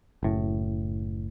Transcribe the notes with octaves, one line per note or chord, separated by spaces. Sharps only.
F#1 A2